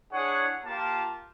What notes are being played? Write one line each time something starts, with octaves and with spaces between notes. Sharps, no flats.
D4 E4 G#4 C#5 F#5
A#3 F4 G4 A5